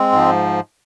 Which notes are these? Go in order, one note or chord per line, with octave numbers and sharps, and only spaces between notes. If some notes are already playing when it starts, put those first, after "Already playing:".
Already playing: G#3 C4
G#2 F3